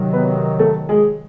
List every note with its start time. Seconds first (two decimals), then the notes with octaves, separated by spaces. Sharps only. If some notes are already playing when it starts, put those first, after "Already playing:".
Already playing: C3 D#3 F#3
0.13 B3 B4
0.59 A3 A4
0.89 G#3 G#4